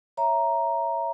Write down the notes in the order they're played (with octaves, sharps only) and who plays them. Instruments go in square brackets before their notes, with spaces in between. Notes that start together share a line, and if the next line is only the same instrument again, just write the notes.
[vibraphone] C#5 E5 A#5